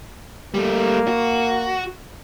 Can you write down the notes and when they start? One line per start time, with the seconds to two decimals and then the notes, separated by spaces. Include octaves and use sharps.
0.54 G3 A3 A#3
1.07 F#4